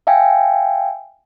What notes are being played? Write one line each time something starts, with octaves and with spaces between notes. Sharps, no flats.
E5 F5 G5 G#5